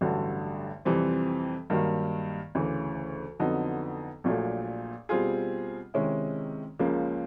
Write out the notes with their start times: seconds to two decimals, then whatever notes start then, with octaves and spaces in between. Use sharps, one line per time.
0.01 A1 G2 D3 F#3
0.85 F2 C3 E3 G3 C4
1.70 G2 D#3 F#3 A#3
2.55 D2 C#3 E3
3.39 F2 D3 F#3 B3 D#4
4.24 A#1 A#2 F#3 A3
5.09 B2 G3 C4 F4 G#4
5.94 C3 D#3 G#3 C#4 E4
6.79 C#2 C#3 F3 A#3